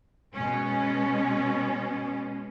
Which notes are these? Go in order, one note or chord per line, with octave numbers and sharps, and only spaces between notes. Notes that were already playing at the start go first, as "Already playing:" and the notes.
B2 G#3 C#4